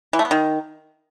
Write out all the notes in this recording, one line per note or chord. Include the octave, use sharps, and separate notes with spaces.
E3
A3
B3
D#3